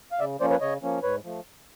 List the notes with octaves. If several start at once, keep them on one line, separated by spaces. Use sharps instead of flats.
F5
C#3 D5 E5
F3 A#3 C#4 C5 D5
B4 C#5
C#3 C#5 D#5
F3 A#3 C#4
G#2 B4 C#5
F3 A3